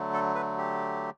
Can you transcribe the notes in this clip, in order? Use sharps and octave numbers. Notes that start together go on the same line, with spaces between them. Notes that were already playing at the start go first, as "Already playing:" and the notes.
Already playing: D3 F#3 A3
A4
B4
G4